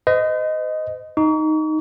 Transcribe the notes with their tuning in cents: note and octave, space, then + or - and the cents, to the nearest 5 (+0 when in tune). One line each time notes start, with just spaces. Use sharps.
C5 -45 D#5 +0
D#4 +0 C#6 +40